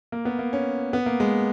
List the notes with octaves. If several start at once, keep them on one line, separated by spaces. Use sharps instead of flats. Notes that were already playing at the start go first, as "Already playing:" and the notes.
A#3
B3
A#3
C#4
B3
A#3
G#3